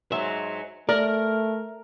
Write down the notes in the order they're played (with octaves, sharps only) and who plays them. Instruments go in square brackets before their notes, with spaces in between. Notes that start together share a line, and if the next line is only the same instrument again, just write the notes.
[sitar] G#2 F#3 [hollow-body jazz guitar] E5
[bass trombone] A3 [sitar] A#4 [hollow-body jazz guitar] D5